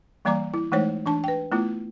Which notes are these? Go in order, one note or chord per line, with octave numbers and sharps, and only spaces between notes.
E3 G3 A#3 D5 A#5 D6
E4
E3 G#3 A3 D#4 C5 C#5
E3 D4 A5
B4 G5
A3 B3 E4 F4